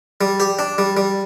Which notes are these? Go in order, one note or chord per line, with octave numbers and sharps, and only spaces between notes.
G3
G4
D4
G3
G3